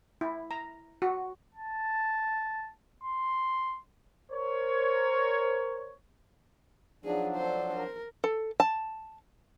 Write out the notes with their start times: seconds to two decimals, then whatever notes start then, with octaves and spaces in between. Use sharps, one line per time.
0.21 E4
0.51 A#5
1.02 F#4
1.55 A5
3.03 C6
4.31 A#4 C5 C#5
7.04 F3 F#3 D4 D#4 G#4
7.37 A4 C5
7.76 A#4
8.24 A4
8.60 A5